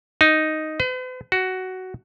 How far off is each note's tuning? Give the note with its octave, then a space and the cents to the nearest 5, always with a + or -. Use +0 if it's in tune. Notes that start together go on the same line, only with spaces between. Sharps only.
D#4 +0
B4 +45
F#4 +10